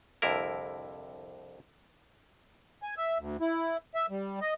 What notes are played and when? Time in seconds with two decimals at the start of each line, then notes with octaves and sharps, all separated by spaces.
0.22 C2 F2 D3 E4 A#4
2.83 G#5
2.97 E5
3.19 D2
3.41 E4
3.94 E5
4.10 G3
4.41 D#5